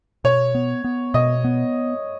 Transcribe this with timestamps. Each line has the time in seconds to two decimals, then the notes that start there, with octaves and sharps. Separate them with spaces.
0.24 B2 C#5
0.55 B3
0.84 B3
1.14 B2 D#5
1.44 B3